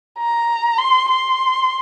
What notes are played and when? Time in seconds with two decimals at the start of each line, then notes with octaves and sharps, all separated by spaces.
0.18 A#5
0.78 C6
1.09 C6